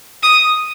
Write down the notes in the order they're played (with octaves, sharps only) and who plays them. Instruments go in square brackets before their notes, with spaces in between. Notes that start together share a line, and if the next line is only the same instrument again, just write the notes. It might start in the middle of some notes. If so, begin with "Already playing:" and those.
[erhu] D#6